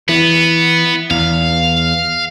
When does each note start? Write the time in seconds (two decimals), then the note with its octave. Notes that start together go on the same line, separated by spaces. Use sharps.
0.09 E3 B3
1.10 E2 F5